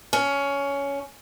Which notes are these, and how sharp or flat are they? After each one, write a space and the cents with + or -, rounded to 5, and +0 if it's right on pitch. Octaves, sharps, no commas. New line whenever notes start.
C#4 +15